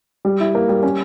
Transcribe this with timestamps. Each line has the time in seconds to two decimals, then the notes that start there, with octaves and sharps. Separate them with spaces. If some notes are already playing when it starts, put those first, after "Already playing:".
0.25 G3
0.40 E4
0.55 A#3
0.69 G3
0.83 C#4